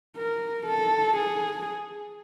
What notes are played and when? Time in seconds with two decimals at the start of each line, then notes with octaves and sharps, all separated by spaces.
0.17 A#4
0.66 A4
1.17 G#4